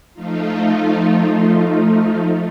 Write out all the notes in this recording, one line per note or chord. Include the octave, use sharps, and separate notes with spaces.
F3 A3 D#4 F4